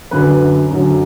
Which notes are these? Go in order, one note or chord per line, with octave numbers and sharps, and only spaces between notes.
F#2 D3 F#3 B4
F#2 D3 F#3